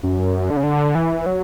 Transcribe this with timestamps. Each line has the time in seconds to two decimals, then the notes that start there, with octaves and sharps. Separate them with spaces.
0.03 F#2
0.50 D3
0.57 C#3
0.63 D3
0.95 E3
1.26 F#3